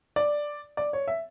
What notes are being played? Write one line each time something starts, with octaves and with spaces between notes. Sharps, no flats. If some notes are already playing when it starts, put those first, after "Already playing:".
D5
D5
C#5
E5